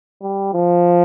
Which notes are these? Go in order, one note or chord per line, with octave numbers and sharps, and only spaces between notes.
G3
F3